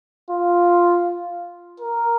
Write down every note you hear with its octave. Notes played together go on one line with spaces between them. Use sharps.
F4
A#4